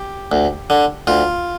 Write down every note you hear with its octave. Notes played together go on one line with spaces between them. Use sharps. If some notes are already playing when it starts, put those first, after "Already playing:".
Already playing: G4
D2
D3
D2 F4